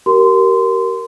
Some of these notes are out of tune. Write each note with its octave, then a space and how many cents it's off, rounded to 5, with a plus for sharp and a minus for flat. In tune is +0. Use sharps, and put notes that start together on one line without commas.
G4 -35 A#4 +0 C6 -20